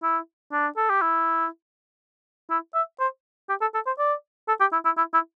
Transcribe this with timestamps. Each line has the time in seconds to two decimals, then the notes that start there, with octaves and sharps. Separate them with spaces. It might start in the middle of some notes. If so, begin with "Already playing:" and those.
0.03 E4
0.52 D4
0.77 A4
0.90 G4
1.02 E4
2.50 E4
2.74 E5
3.00 C5
3.49 G4
3.61 A4
3.74 A4
3.87 C5
3.99 D5
4.48 A4
4.61 G4
4.73 E4
4.85 E4
4.98 E4
5.14 E4